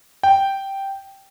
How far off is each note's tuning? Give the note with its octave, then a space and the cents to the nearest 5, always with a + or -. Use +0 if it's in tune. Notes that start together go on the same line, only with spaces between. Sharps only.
G5 -5